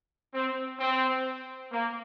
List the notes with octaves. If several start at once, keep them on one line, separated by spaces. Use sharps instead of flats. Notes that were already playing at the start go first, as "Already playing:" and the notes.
C4
C4
A#3